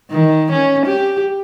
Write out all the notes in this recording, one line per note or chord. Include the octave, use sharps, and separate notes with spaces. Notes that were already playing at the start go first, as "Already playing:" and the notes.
D#3
C#4
G4